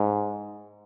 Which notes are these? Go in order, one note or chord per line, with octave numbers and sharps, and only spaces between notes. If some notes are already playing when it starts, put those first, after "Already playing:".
Already playing: G#2